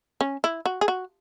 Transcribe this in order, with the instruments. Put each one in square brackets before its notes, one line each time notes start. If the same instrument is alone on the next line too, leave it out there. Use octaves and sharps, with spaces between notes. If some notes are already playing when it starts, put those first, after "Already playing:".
[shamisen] C#4
E4
F#4
G#4
F#4